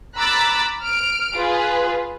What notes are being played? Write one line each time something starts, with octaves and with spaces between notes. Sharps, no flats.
A#5 B5 D6 E6 F#6 A6
F6 D7
F4 G#4 B4